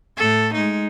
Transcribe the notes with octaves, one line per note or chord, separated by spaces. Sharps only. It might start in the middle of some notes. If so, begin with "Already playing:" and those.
A2 A4
G#3 D#4